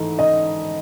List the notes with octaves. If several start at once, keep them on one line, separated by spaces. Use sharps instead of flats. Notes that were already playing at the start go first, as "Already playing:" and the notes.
Already playing: G#2 E3 A3
D#5